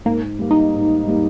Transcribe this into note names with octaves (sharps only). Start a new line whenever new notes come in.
G#2 A#3
G3 A#3
D#4
G#2
G3 A#3